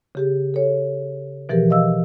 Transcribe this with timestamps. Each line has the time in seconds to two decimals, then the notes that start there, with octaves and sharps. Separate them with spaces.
0.15 C#3 G4 G#4
0.54 A4 C#5
1.49 B2 E3 F3 G4 G#4 A#4
1.70 D#5 F5 E6